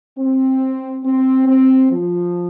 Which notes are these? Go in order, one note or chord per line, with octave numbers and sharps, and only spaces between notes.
C4
C4
C4
F3